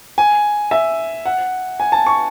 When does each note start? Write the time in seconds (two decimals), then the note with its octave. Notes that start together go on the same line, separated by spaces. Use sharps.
0.18 G#5
0.71 E5
1.25 F#5
1.80 G#5
1.92 A5
2.07 C#6